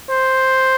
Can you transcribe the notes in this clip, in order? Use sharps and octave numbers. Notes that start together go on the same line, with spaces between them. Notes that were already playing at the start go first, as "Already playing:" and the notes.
C5